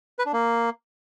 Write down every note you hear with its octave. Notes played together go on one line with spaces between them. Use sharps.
B4
D4
A#3